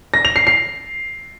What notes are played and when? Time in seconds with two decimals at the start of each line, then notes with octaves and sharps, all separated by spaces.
0.14 A#6
0.25 F7
0.36 C7
0.47 C7